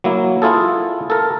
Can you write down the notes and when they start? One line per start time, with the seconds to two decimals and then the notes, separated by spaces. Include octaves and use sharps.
0.04 F#3 A#3 E4
0.42 E4 F4 G#4 A4
1.10 A4 A#4